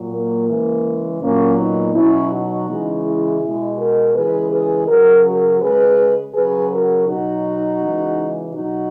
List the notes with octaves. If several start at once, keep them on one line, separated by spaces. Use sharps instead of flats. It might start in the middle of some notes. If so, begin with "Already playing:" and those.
Already playing: A#2 F#3
A#3
C#3 E3 G#3
A#2 F#3 A#3 C#4
B3 D#4
B2 F#3 C#4 E4
D#4 F#4
C#3 E3 G#3
E4 G#4
B2 G#3
F#4 A#4
C#3 E3 G#3 G#4 B4
G#4 B4
C#3 F#3 F#4 A#4
F#4 A#4
C#3 G#3 G#4 B4
C#3 F#3 G#4 B4
F#4 A#4
B2 F#3 D#4 F#4
C#3 E3 G#3
B2 F#3 D#4 F#4